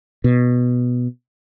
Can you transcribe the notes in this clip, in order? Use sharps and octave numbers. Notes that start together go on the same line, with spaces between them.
B2